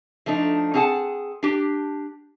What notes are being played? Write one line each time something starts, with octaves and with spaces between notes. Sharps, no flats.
F3 A3 D4 D#4
C4 D4 G#4 F#5 A5
D4 G4